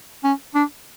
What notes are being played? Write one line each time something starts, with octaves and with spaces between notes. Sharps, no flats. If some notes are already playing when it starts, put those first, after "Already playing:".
C#4
D4